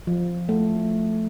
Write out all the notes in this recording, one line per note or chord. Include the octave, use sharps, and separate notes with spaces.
F3
A3